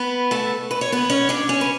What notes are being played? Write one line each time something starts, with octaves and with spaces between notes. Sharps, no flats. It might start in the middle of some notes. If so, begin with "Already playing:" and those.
Already playing: B3 B4
A3 A4
B4
C#5
B3 B4
C#4 C#5
D4 D5
C#4 C#5
B4